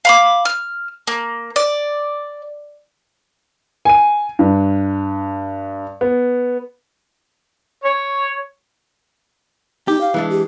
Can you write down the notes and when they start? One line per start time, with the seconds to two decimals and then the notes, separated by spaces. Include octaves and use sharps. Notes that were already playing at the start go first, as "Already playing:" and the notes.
0.05 F5 B5 D6
0.45 F6
1.07 A#3
1.56 D5
3.85 G#5 D#7
4.39 G2
6.01 B3
7.84 C#5
9.88 D#4 G4
10.01 F5
10.14 E3 G#3 D4
10.30 G4